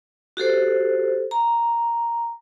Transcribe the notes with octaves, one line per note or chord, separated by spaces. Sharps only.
F#4 G4 A4 C5
A#5